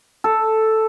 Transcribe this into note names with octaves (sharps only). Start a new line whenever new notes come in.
A4